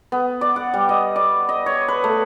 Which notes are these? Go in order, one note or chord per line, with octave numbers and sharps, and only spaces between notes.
B3
D5
F#5
G3
D#5
D5
D#5
C#5
B4
A3